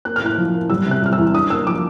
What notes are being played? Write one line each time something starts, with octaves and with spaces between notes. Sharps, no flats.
A#3 F#6
F6
A2 F#6
F3
A#3
G3 E6
C3 F#6
G3 F6
E6
E2
D4 D#6
A#3 E6
F3 D6